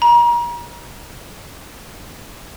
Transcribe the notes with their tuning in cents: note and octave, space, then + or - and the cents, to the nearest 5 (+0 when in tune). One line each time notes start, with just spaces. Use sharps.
A#5 +35